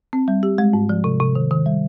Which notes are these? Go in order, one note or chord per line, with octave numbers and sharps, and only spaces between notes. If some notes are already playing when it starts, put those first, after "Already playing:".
C4
G3
G4
G#3
G#2
F3
C3
C3
D#3
D#3
G3